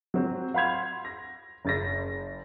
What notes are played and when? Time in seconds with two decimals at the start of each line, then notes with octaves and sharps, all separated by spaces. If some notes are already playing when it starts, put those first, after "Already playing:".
0.14 F#3 C4
0.54 F5 F#5 B5 C6 G#6 F7
1.05 A#6
1.65 F#1 A6 A#6